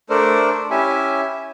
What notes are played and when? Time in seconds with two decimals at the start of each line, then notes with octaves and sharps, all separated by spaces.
0.10 A3 D4 A4 A#4 C5 D5
0.70 C#4 E4 G4 E5 G#5